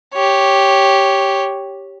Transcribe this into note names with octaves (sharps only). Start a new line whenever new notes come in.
G4 C#5